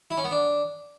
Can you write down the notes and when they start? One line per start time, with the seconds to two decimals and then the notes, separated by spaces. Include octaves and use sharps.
0.11 E4
0.17 C#4
0.24 B3
0.31 D4